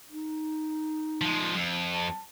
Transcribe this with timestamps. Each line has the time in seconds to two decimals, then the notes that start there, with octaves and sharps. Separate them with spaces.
0.10 D#4
1.21 F3 G#3
1.56 F2
1.94 A5